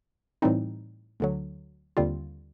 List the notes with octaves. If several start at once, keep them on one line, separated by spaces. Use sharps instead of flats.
A2 E3 G3 C4 D#4
D2 D3 F#3
D#2 D3 G3 C4 F4